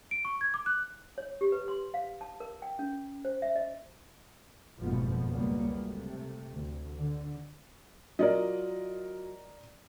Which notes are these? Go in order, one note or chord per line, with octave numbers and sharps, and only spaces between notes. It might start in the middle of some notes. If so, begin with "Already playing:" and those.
D7
C#6
G#6
D6
F#6
C#5
G4
B4
C6
F5
A5
A#4
G5
C#4
C5
E5
D#5
F#1 F2 G#2 B2 F3 B3
C#2 F#3 G3 A#3 B3
C3 A3
D2
D3
F#3 E4 F4 A#4 D5 D#5